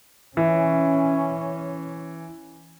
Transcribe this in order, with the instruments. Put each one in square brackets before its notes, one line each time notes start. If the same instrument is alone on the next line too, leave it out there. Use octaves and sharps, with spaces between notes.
[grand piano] E3 [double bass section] C#4